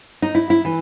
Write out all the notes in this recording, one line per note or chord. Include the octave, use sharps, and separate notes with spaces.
D#4
E4
E4
E3